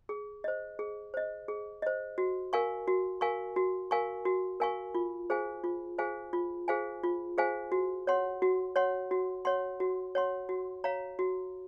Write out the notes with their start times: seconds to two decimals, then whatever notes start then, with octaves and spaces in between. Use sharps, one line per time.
0.09 G#4
0.44 C5 D#5
0.79 G#4
1.14 C5 D#5
1.48 G#4
1.82 C5 D#5
2.18 F#4
2.53 A#4 F5 G#5 C#6
2.88 F#4
3.21 A#4 F5 G#5 C#6
3.56 F#4
3.91 A#4 F5 G#5 C#6
4.25 F#4
4.60 A#4 F5 G#5 C#6
4.95 F4
5.30 G#4 C5 F5 G#5
5.64 F4
5.98 G#4 C5 F5 G#5
6.33 F4
6.68 G#4 C5 F5 G#5
7.03 F4
7.38 G#4 C5 F5 G#5
7.72 F#4
8.07 C#5 F#5 C6
8.42 F#4
8.76 C#5 F#5 C6
9.11 F#4
9.45 C#5 F#5 C6
9.80 F#4
10.15 C#5 F#5 C6
10.49 F#4
10.84 C#5 F5 A#5
11.19 F#4